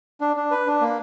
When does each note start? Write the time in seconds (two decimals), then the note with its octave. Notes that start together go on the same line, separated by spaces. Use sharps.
0.21 D4
0.37 D4
0.51 B4
0.67 D4
0.81 A#3